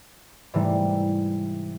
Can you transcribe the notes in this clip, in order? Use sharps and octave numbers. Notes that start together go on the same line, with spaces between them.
G#2 C3 E3 G3 A3